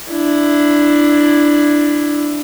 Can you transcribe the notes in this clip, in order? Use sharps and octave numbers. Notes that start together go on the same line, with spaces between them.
D4 E4